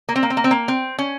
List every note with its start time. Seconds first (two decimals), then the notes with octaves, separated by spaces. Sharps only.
0.09 A#3
0.16 C4
0.23 A#3
0.30 C4
0.37 A#3
0.44 C4
0.51 A#3
0.68 C4
0.98 C#4